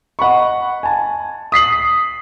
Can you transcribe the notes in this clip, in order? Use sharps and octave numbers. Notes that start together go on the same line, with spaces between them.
D#5 F#5 B5 C#6
G#5 A5
D#6 B6 C7 F#7